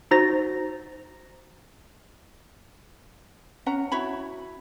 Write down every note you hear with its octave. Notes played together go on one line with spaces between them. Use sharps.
D#4 F#4 C5 A#5 A6 A#6
C#4 F#5 A#5
E4 F#4 C#5 B5